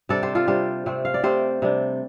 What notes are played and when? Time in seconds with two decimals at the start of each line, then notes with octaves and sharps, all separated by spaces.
0.09 C3 G3 D4 A4 D5
0.23 G4 C5
0.35 F4 A4
0.47 C3 G3 D4 G4 C5
0.86 C3 A3 C4
1.05 F5
1.14 D5
1.23 C3 A3 C4 G4 C5
1.62 C3 G3 D4